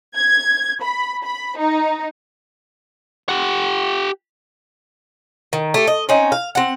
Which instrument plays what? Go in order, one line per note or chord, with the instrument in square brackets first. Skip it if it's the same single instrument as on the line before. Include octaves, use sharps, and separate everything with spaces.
[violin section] G#6
B5
B5
D#4
[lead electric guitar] G4 F#5
[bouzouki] D#3
A3 G4
D#5
C4 C#4 D#4
F5
C4 F#5